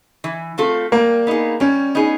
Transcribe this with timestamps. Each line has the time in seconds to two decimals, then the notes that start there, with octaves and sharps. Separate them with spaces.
0.24 E3
0.58 A3 C4 F4 A4
0.92 G3 A#3
1.27 B3 D#4 G#4
1.60 G3 C#4
1.95 B3 D#4 G#4